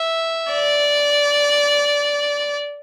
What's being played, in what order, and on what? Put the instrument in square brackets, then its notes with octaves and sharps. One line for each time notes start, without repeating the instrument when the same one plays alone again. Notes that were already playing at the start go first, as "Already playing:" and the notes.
Already playing: [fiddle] E5
D5